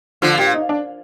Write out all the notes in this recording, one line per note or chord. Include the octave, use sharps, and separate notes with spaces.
D3 F3 F4
A#2 G4
D#4
D4